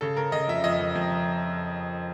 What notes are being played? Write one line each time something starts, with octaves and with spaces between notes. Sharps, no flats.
C#3 A4
C#3 A#4
C#3 D#5
F2 E5
F2 D#5
F2
F2